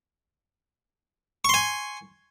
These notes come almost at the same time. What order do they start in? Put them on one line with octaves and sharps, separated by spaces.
C#6 C6 G#5